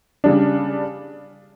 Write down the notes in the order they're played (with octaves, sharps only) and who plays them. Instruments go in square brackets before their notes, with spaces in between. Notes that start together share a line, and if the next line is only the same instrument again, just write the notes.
[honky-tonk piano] C#3 G3 D4